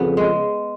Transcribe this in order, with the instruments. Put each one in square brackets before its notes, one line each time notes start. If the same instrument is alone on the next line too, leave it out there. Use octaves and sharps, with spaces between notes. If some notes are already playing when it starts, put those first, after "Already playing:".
Already playing: [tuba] F2 [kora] C#3 B3
[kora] G#3